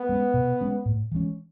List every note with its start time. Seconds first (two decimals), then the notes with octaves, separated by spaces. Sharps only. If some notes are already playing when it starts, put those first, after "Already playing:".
Already playing: B3
0.09 G#3 C#4
0.34 B2
0.61 G#3 C#4
0.86 A2
1.12 E3 G#3 C#4